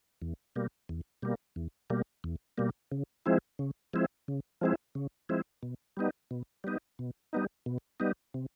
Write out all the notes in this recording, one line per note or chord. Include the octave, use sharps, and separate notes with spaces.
E2
B2 G3 A#3
E2
B2 G3 A#3
E2
B2 G3 A#3
E2
B2 G3 A#3
C#3
F3 G#3 C4 E4
C#3
F3 G#3 C4 E4
C#3
F3 G#3 C4 E4
C#3
F3 G#3 C4 E4
B2
G3 B3 D#4
B2
G3 B3 D#4
B2
G3 B3 D#4
B2
G3 B3 D#4
C3